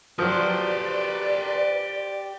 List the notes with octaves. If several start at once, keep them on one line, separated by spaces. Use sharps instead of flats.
F3 F#3 G4 B4 C5 D5